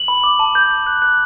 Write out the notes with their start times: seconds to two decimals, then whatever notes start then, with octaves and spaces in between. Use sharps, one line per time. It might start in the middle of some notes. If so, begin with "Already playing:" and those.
Already playing: F#7
0.08 B5
0.24 D6
0.39 A5
0.55 G6
0.71 G6
0.87 F#6
1.02 F#6